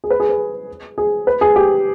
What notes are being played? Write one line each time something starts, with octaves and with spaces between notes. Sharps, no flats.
G#4
B4
G#4
B4
G#4
B4
G#4
G4